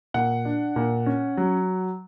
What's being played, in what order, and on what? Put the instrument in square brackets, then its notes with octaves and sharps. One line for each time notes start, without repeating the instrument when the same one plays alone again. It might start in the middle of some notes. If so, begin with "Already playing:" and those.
[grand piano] A#2 F#5
D4
A#2
C#4
F#3